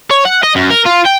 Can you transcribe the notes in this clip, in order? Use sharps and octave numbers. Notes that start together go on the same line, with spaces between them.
C#5
F#5
D#5
F#2
A#4
F4
G5